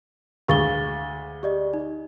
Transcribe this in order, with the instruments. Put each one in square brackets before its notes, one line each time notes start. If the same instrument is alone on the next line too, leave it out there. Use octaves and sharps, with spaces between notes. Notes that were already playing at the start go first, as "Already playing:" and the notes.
[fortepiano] D2 G#3 C#6 [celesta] F5 A6 G7
[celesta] G4 D5 D#5
D#4